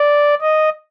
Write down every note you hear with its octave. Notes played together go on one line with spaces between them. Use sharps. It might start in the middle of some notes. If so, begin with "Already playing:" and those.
Already playing: D5
D#5